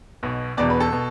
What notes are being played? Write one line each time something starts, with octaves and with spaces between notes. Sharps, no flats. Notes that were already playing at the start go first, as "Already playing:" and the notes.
B1 B2
E1 E2 B2 D5
B4
A4
B2